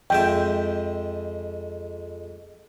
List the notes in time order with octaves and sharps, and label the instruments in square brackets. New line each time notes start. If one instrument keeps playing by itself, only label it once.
[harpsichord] F2 G#3 E5 [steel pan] G5